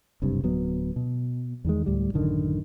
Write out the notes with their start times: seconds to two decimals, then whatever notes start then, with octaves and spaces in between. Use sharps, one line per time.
0.22 F#1 C2 G2 C3
0.44 D1 F#3 B3
0.96 B2
1.65 E2 D#3 G#3
1.86 D2 A2 G3
2.14 A1 F#2 D3 D#3